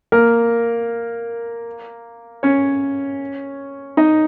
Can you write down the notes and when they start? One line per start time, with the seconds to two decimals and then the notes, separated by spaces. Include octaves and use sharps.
0.12 A#3 A#4
2.43 C#4 C#5
3.97 D#4 D#5